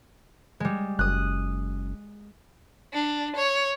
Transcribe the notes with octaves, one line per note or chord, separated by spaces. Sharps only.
G3 G#3
F#1 D#6 F#6
D4
C#5